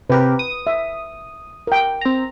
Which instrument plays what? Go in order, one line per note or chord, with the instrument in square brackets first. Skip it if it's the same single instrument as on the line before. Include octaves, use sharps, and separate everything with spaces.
[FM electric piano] C3 G4 A#4 [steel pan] B4
[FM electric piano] D#6
[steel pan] E5
A#4 G5
[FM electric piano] C4 A#5